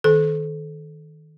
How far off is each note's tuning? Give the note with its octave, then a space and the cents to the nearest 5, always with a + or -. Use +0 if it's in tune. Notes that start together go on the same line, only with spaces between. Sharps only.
D#3 +0 A4 -30